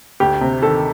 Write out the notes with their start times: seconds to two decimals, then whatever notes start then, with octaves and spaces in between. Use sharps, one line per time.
0.20 D2 G4
0.41 C3
0.62 D#3 A4